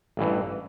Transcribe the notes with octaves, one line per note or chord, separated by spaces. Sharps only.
A1 G2 E3